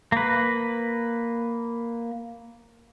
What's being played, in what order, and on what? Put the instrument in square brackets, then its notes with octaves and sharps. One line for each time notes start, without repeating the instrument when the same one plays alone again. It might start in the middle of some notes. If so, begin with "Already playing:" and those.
[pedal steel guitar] A#3 B4